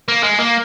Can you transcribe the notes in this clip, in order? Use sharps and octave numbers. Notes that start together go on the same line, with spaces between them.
A#3
G#3
A#3